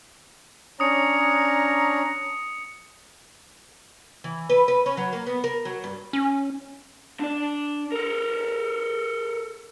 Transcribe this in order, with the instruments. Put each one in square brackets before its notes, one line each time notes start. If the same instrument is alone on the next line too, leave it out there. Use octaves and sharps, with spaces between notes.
[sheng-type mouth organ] C#4 D4 C#5 [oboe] A#5 [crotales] D#6 C#7
[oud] E3
B4
B4
C#4
F#3
A#3
B3
A#4
F#3
G2
[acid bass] C#4
[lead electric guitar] D4 D5
A4 A#4